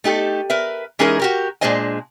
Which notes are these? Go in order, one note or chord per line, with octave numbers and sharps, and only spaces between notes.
A3 D#4 G4 A4
A#4 B4 E5
E3 G#3 C#4 D#4 G#4 A#4
F#4 G4 A#4
A#2 G#3 D4 C5 D#5 G#5